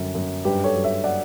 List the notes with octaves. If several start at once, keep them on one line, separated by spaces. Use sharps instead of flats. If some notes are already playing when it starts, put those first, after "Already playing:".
Already playing: F#2 D3 G3
F#2
G2 G4 B4
A4 C#5
F#3
C#5 E5
D5 F#5